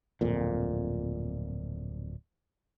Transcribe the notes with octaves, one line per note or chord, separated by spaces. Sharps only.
D1 F2 A#2